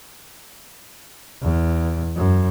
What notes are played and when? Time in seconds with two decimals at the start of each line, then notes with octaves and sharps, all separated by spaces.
1.42 E2
2.16 F#2